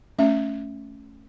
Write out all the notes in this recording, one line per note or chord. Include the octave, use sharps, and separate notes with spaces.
A3 C#4 E5